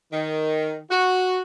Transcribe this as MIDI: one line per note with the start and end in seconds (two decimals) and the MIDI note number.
0.12 0.78 51
0.91 1.42 66